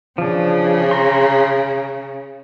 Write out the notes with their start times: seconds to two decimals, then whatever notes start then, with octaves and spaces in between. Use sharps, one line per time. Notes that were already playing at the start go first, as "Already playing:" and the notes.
0.18 C#3 F3 D4
0.91 A#5 C6